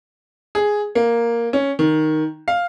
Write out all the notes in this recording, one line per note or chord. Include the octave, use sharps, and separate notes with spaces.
G#4
A#3
C#4
D#3
F5